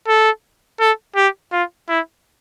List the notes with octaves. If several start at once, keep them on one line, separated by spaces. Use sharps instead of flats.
A4
A4
G4
F4
E4